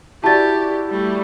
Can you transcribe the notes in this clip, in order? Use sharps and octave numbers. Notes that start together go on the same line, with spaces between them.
E4 F#4 G4 D5 A5 A6
G3 A3